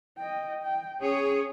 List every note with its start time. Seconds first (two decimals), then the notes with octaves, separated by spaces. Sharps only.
0.18 D#5 G5
0.63 G5
1.01 C#4 G#4 C#5